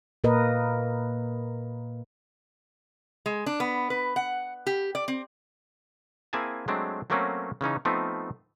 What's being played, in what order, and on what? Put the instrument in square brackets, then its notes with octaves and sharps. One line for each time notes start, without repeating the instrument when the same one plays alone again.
[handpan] A#2 A#3 A#4 B4 D#5
[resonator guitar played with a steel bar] G#3
D4
B3
B4
F#5
G4
D5
C4
[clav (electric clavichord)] A#3 C4 E4 G#4 G#5 A5
F#3 G#3 A3 C4 D4
F#3 A3 A#3 C4 C#4 F#4
C#3 E3 C#4 D#4
F3 A3 B3 C4 D#4 F4